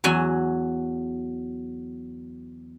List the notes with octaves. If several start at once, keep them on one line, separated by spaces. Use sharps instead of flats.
E2 F#3 F#4 G#5